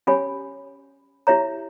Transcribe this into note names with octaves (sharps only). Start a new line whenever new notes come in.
C#4 G4 C#5 G#5 B5
E4 G4 C#5 E5 A#5